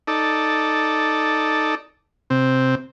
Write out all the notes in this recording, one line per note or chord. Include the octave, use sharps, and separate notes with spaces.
D#4 A4 D5
C3 C4